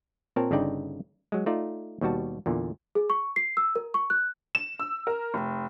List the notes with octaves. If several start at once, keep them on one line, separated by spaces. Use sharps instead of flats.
A#2 C4 A#4 C#5 A5
G1 C#3 D4 D#4 D5 G5
F#3 G#3
A3 D#4 F4 D5
D#2 B2 G3 F#4 A5
E2 A#2 D3
G#4
C#6
C7
E6
A#4
C#6
F#6
E7
E6
A#4
F1